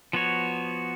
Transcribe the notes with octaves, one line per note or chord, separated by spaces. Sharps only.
F3 B3 F#4 C#5